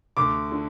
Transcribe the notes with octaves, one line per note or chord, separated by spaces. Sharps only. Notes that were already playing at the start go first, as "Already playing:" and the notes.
D2 D6
D3